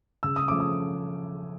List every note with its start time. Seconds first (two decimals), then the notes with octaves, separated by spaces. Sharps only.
0.23 C#3 E6
0.36 D#6
0.48 F3 A3 C#4 D6
0.60 D#6